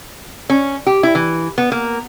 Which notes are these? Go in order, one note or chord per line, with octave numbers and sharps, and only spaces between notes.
C#4
G4
E4
E3
B3
A#3